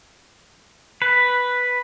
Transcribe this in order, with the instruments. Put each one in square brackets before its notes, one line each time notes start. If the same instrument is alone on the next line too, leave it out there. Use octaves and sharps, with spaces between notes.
[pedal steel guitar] B4